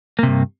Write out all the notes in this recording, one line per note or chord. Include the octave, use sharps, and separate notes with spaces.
G2 C3 A#3